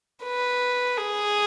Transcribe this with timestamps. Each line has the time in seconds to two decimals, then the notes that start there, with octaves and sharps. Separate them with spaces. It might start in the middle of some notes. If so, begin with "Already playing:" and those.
0.23 B4
0.98 G#4